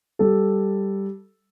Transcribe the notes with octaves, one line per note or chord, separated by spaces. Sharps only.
G3 A4